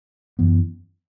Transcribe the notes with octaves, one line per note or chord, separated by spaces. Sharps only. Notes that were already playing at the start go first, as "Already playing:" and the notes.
F#2 E3 B3